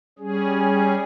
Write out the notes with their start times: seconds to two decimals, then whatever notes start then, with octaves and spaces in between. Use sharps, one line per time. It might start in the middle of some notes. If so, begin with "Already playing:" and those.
0.19 G3 C#4 G#4